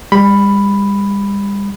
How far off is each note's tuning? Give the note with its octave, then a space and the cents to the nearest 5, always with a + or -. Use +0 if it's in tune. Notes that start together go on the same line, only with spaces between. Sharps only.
G3 +40 B5 +5